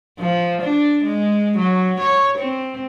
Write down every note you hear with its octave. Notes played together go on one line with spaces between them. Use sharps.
F3
D4
G#3
F#3
C#5
C4